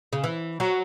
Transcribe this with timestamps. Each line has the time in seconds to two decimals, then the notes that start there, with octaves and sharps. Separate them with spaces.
0.13 C#3
0.24 E3
0.60 F#3